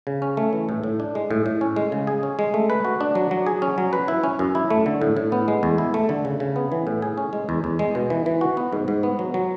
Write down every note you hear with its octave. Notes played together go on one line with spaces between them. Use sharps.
C#3
C#4
A3
E3
A2
A2
D4
G#3
A2
A2
C#4
G#3
C#3
G#4
C#4
G#3
A3
B4
F#4
D4
F#3
F#3
G#4
C#4
F#3
B4
E4
C#4
F#2
E4
A3
D3
A2
A2
B3
G#3
E2
E4
A3
D3
C#3
C#3
B3
E3
A2
G#4
C#4
G#3
E2
E2
G#3
B2
E3
E3
F#4
B3
G#2
G#2
B3
F#3
F#3